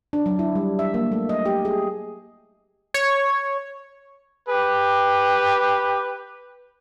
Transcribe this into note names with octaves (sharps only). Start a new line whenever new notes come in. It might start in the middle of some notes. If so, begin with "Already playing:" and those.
D4
F#3
E4
G3
E5
A#3
A3
D#5
G4
G#4
C#5
G4 B4